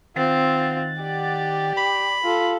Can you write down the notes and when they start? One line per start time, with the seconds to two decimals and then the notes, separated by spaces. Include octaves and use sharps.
0.16 D#3 C4 F4 F#5 A6
1.01 G4 D5
1.77 B5
2.24 F4 A4